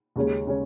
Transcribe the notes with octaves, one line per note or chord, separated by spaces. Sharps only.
D#2 C#3 G#3 C#4
C#3 G#3 C#4